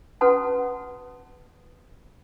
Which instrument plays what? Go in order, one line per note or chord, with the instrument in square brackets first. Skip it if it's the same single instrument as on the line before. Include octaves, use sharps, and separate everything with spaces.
[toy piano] C#4 F#4 B4 F#5 A5 D#6